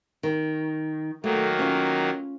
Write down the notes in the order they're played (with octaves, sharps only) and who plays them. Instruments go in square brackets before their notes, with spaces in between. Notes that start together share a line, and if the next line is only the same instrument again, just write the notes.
[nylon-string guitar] D#3
[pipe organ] D#3 F#3 A#3 [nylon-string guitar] A3
[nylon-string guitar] C#4 F4